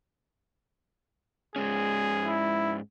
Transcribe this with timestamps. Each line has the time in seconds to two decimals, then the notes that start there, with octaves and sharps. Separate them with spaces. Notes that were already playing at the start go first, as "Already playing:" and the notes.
1.56 G#2 G#3 C#4 G#4
2.24 E4